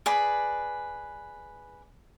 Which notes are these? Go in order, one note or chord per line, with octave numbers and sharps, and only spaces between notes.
G#4 B4 D5 B5